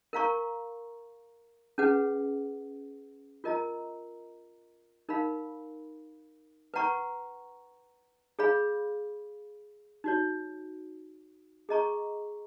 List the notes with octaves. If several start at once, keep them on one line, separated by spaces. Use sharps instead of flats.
A#4 F5 A#5 C#6
C#4 G#4 B4 F#5
F4 A#4 D#5 A#5
D#4 A#4 F5 B5
B4 F#5 A#5 C#6
G#4 C#5 F5 B5
D#4 F#4 C#5
G#4 D#5 A#5 C#6